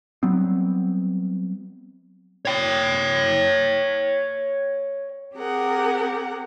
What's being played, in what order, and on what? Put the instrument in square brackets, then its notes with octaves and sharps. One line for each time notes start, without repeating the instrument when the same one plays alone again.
[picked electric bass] F#3 G3 B3 C4
[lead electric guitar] C#5 G5
[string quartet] C4 G4 G#4 A#4 F#5